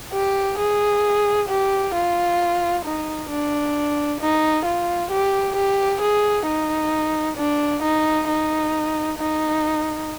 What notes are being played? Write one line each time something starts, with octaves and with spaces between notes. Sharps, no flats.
G4
G#4
G4
F4
D#4
D4
D#4
F4
G4
G4
G#4
D#4
D4
D#4
D#4
D#4